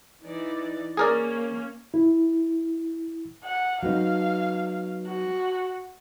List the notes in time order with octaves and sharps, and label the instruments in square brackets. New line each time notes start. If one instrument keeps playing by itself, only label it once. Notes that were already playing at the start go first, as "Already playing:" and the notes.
[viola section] E3 D#4 D5
[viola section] A#3 C#4 [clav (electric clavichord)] G#4 A#4 D5
[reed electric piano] E4
[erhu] F#5
[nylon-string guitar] F#3 B3 D#4 [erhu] F5
[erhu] F#4